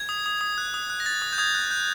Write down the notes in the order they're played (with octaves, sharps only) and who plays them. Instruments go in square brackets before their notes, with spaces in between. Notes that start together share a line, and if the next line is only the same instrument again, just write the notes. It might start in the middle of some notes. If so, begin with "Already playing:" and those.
Already playing: [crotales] G#6
D#6
D#6
D#6
F#6
D#6
F#6
A#6
F#6 A6
D#6
G6
D#6 G#6
F#6
F#6 G6